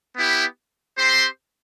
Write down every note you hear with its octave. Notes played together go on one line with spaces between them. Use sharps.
B3 E4 G4
C4 G4 C5 C6